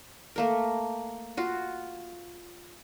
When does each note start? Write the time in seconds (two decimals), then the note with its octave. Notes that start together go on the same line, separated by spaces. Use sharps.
0.36 A3 A#3 A#4
1.37 F4 F#4